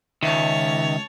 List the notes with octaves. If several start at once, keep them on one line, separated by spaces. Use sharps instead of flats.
C#2 D#3 C#5 E5 A5